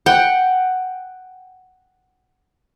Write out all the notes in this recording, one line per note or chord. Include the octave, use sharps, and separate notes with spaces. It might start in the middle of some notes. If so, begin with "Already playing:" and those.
F#5 G5